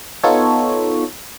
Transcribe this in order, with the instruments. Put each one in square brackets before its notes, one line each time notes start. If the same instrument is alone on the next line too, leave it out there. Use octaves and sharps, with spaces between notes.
[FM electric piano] B3 D#4 F4 A4 C#5